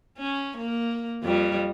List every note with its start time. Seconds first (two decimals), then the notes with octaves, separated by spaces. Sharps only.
0.18 C#4
0.57 A#3
1.23 F2 G3